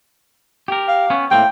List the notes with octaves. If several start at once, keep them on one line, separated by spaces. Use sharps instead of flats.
G4 A#4
F5
B3 C#4
A2 A#3 C4 G5